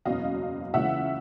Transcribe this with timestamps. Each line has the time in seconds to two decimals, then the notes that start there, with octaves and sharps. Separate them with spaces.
0.05 F#1 E2 B2 F#3 D#5 F5
0.74 C#2 C#3 E3 E5 F#5